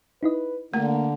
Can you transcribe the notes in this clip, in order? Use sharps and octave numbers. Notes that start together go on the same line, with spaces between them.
D#4 E4 B4 D#5
D3 A3 A#3